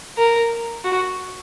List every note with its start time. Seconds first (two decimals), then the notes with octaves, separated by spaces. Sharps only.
0.18 A#4
0.84 F#4